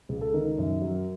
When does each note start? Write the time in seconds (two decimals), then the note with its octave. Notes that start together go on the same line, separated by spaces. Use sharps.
0.09 C#2
0.21 A4
0.33 D#3 A#4
0.59 F#2
0.82 F#3